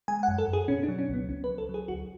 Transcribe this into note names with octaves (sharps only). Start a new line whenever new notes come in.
G#3 G#5
F#5
F#2
A4
F#2
G#4
B2 C#4
D4
F#3
C#4
C#2 B3
C#2 C#4
B4
F#3
A4
F#3
G#4
D2 F#4